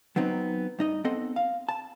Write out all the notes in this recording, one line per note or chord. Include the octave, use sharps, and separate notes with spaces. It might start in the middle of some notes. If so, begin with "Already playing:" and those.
F#3 B3 C4 D#4
G2 D#4 D#5
B3 C4 A4 D#5 F#5
F5
A5